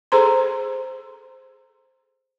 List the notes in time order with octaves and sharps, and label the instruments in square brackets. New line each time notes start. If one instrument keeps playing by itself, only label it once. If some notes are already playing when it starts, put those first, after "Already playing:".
[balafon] G#4 A4 C5 A#5 C6